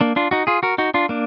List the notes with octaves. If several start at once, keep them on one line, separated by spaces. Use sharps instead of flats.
A#3 D4
D4 F4
D#4 F#4
F4 G#4
F#4 A#4
D#4 F#4
D4 F4
A#3 D4